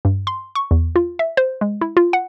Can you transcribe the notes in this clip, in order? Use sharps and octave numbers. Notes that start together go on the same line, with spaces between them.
G2
C6
C#6
E2
F4
E5
C5
G#3
E4
F4
F#5